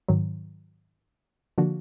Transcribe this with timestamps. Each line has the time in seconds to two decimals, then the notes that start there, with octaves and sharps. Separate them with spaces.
0.08 G#2 D#3 F#3
1.58 D3 F3 A#3 D4 F#4